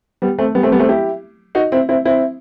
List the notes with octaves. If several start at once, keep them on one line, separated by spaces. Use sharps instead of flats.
G3 B3
A3 C4
G3 B3
A3 C4
G3 B3
A3 C4
E4 G4
D#4 F#4
C4 E4
C4 E4
C4 E4